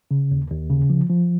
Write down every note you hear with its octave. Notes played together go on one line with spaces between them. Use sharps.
C#3
D#2
D#2
C#3
F3
F3